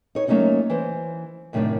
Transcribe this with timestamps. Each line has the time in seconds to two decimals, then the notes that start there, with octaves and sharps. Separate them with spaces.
0.15 D#4 C#5
0.27 F#3 A3 A#3 C#4 D#4 F#4
0.70 E3 C5
1.53 F#2 A2 C3 D#3 D4